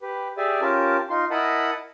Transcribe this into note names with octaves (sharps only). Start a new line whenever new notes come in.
G4 B4
G4 G#4 D5 E5 G#5
C#4 F4 G4 A#4 A5
D#4 F4 C6
E4 A#4 D#5 F#5 A5 B5